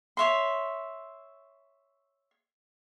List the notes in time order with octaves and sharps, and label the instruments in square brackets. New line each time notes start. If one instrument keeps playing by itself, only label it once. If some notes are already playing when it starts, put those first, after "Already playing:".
[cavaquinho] C#5 E5 C6